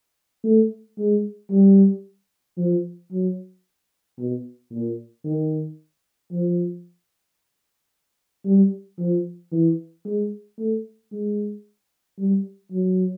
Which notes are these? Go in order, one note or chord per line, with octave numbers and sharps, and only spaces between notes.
A3
G#3
G3
F3
F#3
B2
A#2
D#3
F3
G3
F3
E3
G#3
A3
G#3
G3
F#3